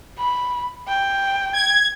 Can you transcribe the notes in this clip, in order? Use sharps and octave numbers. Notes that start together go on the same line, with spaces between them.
B5
G5
G#6